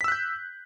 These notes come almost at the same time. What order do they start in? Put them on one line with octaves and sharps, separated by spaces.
B6 E6 F#6 G6